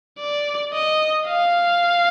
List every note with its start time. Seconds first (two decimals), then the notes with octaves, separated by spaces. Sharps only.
0.20 D5
0.74 D#5
1.27 F5